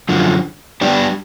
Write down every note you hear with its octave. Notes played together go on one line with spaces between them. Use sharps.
F#2 D3 F3
G3 B3 D4 G4